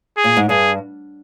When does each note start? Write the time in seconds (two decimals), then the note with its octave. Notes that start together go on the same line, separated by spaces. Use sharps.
0.17 G#4
0.24 A#2
0.37 G#2
0.49 G2 G#4